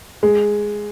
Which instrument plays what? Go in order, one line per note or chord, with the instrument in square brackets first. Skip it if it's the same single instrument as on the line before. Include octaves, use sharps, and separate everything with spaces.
[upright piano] G#3